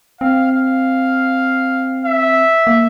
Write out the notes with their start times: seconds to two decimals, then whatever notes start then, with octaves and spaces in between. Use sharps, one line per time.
0.21 C4 F5
0.52 F5
2.05 E5
2.67 A#3